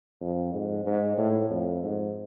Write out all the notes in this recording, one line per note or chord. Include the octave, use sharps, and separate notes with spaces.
F2
G#2
G#2
A2
F2
G#2